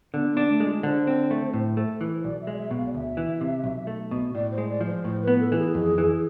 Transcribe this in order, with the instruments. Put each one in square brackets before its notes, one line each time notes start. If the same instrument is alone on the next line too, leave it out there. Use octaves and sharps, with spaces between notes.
[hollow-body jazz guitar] D3 [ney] B3
[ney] B3
[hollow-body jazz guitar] D4
[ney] A3
[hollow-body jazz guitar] G#3
[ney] F4
[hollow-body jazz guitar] D3 [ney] C5
[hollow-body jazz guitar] C4
A3
A2
A3
E3
[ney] C5
[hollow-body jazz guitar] B1 [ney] D5
[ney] E5
[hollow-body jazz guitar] G#3
[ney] D5
E5
[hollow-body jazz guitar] B2
[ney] F5
D5
[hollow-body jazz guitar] D2 [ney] E5
[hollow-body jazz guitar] E3
C3
B1
A3
B2
[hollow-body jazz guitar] A2 [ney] D5
[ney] C5
[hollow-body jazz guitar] G#3
[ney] D5
[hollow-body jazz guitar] F3
[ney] C5
[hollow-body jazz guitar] A2 [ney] C5
[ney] B4
[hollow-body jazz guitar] B3
[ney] A4
[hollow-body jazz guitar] E3 [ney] F4
[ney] G#4
[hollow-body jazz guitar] F2
E3